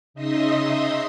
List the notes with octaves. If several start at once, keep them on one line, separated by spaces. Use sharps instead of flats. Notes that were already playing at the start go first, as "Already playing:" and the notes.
C#3 D#4 D#5 E5 C6 D#6